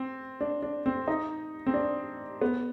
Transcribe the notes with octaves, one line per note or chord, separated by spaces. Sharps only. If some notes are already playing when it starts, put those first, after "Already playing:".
Already playing: C4
D4
D4
C4
D#4
C4
D4
B3